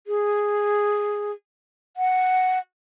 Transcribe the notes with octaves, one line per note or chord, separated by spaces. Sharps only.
G#4
F#5